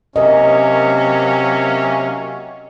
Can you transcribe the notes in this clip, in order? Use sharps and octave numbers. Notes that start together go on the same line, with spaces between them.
C3 F#3 A#3 C#4 A#4 D#5